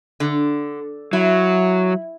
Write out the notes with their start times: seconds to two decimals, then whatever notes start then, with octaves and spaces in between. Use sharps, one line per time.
0.20 D3
1.13 F#3 E4